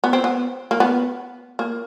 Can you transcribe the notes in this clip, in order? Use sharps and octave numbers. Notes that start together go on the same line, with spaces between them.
B3
C4
B3
A#3
B3
A#3